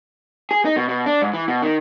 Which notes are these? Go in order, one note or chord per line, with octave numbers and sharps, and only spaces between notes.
G#4
D#4
B2
B2
D4
G#2
E3
B2
D#3